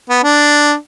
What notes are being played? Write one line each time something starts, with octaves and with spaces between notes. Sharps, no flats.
B3
D4